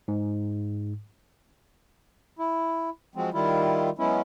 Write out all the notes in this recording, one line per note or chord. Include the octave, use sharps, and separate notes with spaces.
G#2
E4
F3 F#3 G#3 C4
D#3 G3 E4 F4
F#3 G#3 B3 C#4 E4